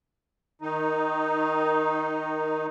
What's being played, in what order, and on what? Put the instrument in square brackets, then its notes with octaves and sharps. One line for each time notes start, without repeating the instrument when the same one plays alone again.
[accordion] D#3 D#4